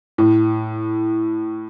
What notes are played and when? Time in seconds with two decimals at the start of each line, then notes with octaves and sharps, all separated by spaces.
0.18 A2